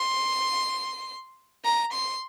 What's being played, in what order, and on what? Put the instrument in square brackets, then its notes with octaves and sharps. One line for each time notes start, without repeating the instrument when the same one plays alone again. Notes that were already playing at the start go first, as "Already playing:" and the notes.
Already playing: [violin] C6
A#5
C6